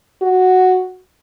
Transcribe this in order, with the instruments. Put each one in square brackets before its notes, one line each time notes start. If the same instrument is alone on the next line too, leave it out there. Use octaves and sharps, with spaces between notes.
[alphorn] F#4